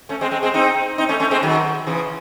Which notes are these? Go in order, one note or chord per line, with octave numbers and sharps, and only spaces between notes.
A3 C#4
G#3 C4
G#3 C4
G#3 C4
C4 D#4
C4 D#4
A3 C#4
A3 C#4
G#3 C4
D#3 F#3
C#3 E3